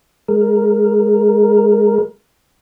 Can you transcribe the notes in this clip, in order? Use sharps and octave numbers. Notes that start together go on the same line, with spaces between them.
G#3 A#4